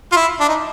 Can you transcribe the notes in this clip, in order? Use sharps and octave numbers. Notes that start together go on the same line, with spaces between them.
F4
E4
D4
D#4